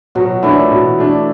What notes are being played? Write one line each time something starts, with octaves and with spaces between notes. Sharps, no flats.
B2 F#3 F#4
E3 A3 D4 E4
B2
A3 D4